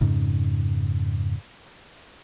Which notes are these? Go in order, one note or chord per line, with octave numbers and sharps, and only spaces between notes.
F2 G#2 C#3